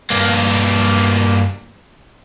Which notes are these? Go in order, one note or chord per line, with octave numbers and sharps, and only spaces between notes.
G2 A#3